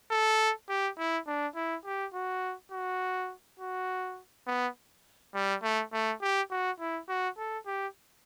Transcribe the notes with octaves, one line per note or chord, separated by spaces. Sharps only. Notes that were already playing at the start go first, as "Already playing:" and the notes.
A4
G4
E4
D4
E4
G4
F#4
F#4
F#4
B3
G3
A3
A3
G4
F#4
E4
F#4
A4
G4